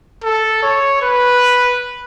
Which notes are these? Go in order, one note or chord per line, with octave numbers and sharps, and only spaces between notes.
A4
C#5
B4